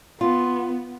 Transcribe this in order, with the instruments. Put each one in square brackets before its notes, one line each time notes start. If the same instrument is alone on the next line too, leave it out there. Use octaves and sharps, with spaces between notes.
[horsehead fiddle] B3 [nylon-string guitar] F4